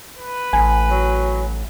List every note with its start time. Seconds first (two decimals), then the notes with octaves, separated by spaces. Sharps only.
0.17 B4
0.53 A1 G#5
0.91 F#3